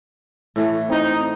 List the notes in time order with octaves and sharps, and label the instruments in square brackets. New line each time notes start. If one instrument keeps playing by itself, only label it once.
[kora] A2 E3 A3
[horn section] C4 D#4